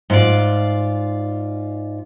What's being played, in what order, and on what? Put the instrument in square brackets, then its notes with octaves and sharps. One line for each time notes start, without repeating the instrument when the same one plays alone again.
[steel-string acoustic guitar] G#2 F4 D5